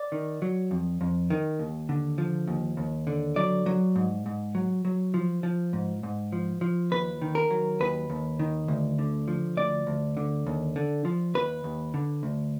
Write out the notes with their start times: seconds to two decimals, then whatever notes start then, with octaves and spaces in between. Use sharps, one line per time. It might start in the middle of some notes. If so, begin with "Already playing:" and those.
Already playing: D5
0.12 D#3
0.42 F#3
0.71 F2
1.01 F2
1.30 D#3
1.59 D#2
1.89 D3
2.18 F3
2.48 D#2
2.77 D#2
3.07 D3
3.36 F#3 D5
3.66 F#3
3.96 G#2
4.26 G#2
4.55 F#3
4.85 F#3
5.14 F3
5.43 F3
5.73 G#2
6.03 G#2
6.32 F3
6.61 F3
6.91 D#2 B4
7.22 D#3
7.35 A#4
7.50 F#3
7.80 D#2 B4
8.10 D#2
8.39 D#3
8.68 D2
8.99 D3
9.28 F3
9.57 D2 D5
9.87 D2
10.17 D3
10.47 D#2
10.76 D3
11.05 F3
11.34 D#2 B4
11.64 D#2
11.94 D3
12.23 D2